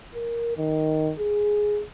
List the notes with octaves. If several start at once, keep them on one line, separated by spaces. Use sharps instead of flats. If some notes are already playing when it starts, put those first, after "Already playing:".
A#4
D#3
G#4